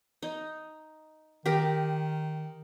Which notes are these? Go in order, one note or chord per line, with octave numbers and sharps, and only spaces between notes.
D#4
D#3 G4 A#4